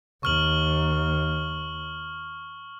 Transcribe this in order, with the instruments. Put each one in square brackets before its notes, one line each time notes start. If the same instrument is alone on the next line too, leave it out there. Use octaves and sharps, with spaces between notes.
[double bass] D#2 [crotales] C#6 F6 F#7